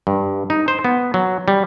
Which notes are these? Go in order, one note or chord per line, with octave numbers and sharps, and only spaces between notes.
G2
D#4
C5
B3
F#3
G3